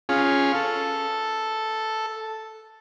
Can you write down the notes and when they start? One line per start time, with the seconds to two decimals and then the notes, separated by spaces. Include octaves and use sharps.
0.09 C#4 F4 G#4
0.55 A4